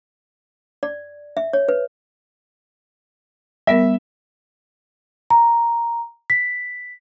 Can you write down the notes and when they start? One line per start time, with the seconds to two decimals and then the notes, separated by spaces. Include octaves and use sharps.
0.83 D5
1.37 E5
1.53 C#5
1.68 B4
3.67 G3 B3 A#4 E5
5.30 A#5
6.30 B6